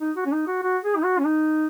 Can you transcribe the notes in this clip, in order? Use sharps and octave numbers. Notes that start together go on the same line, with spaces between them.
D#4
F#4
C#4
D#4
F#4
F#4
G#4
D#4
F#4
C#4
D#4